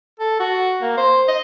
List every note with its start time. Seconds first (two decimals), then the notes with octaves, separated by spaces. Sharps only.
0.20 A4
0.40 F#4
0.82 A#3
0.97 C5
1.28 D#5